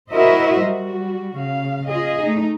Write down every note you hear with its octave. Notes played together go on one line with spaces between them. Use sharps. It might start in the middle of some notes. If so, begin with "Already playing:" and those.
E4 F#4 A#4 C5 D#5 E5
G3 F#4
C#3 F5
F4 G#4 D#5
A3 D#4